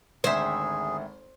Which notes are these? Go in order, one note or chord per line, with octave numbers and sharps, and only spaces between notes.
G#1 D2 G#4 C5 E5 G5 G#5